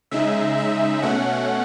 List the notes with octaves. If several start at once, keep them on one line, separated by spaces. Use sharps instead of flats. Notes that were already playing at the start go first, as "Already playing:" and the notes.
C#3 G#3 D#4 E5
E5
B2 A3 C#4 F#5